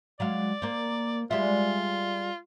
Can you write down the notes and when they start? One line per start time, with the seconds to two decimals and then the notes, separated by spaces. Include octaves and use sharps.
0.20 F#3 G#3 D5 F5
0.62 A#3 C5
1.31 G3 G#3 F4 E5